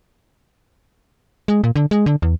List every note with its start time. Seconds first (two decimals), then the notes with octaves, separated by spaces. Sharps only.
1.48 G#3
1.64 A#2
1.76 D3
1.91 G#3
2.06 D3
2.22 E2